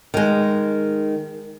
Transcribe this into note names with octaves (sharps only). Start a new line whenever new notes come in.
D#3 G#3